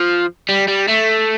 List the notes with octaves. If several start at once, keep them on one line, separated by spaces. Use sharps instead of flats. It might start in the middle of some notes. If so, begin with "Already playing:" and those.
Already playing: F3
G3
G3
A3